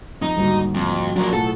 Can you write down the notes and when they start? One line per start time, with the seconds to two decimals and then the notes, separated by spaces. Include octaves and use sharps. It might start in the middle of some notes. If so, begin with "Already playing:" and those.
0.22 F2 D#4 D#6
0.37 D#2 G#2 D3 G3 F#4
0.74 F2
1.16 F3 F#3 D4 A#4 A#5
1.33 B1 A2 F4 G#4 A4 F#5